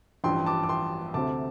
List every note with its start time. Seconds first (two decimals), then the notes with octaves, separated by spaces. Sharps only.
0.24 A1 G2 F3 G5 C6
0.46 A5 D6
0.63 D6
0.69 G5 C6
1.14 D2 C3 A3 C4 A5 D6